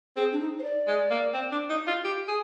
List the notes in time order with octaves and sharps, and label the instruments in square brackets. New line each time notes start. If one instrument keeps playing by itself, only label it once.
[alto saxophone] C4 [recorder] G#4
[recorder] D4
D#4
C5
D5
[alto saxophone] G#3
A#3
C4
D4
D#4
F4
G4
G#4